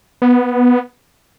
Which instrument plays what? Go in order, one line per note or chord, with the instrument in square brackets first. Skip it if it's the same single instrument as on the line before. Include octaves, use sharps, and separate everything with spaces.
[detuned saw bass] B3